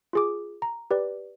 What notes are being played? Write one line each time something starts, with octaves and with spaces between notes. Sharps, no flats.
F4 G#4 D6
A#5
G4 B4 D5